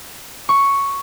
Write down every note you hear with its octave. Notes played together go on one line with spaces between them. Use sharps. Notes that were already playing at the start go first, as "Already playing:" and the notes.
C#6